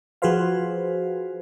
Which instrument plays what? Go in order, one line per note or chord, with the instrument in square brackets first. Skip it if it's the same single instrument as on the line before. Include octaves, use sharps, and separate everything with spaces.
[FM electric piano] F3 F#4 G#4 B4 C5 F5